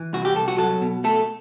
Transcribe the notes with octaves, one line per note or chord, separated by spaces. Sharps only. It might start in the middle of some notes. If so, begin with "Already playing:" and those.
Already playing: E3
C2 F#4
G4
C2 A4
F#4
F#3 A4
B2
A3 A4